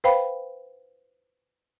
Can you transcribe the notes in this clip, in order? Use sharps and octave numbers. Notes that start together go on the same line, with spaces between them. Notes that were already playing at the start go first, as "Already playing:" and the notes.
B4 C5 F5 G5 B5